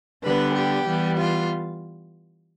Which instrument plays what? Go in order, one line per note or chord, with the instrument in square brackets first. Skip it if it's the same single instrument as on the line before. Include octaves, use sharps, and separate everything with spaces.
[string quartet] D3 G3 B3 B4
G4
E3 G3 B3
F4